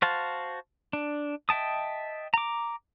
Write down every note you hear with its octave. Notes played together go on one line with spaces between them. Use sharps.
F#4 C5 F5 A5
D4
D#5 E5 G5 A5 D#6
A#5 D6